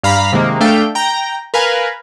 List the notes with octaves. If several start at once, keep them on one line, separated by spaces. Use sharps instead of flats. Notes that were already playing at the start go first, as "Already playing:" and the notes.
G2 F5 A#5 B5
C3 D#3 G#3 A#3
A3 D4 F5 G5
G5 A#5
A#4 B4 F5 G#5